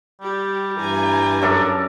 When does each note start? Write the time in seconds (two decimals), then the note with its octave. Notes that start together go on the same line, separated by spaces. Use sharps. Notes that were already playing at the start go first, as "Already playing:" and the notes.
0.22 G3 G4
0.77 G2 E3 G#5 A#5
1.42 F#2 D4 A4 A#4